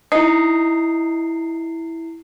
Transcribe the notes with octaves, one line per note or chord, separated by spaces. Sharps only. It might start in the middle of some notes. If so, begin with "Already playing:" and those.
D#4 E4 C7